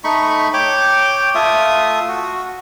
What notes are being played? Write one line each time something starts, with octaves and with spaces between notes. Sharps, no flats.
A3 D#4 B5 C#6
C#5 G5 D6
A3 F4 E5 D#6
F#4